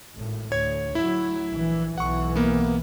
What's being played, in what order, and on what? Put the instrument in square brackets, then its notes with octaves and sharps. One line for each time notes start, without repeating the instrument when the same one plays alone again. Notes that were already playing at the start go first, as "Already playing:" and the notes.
[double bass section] G#1 A2
[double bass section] D2 [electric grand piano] C#5 G#6
[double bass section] D2 F#3 [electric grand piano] E4 E5
[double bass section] A#1 E3
[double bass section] B1 E3 [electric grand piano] F#5 C#6
[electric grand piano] A#3 B3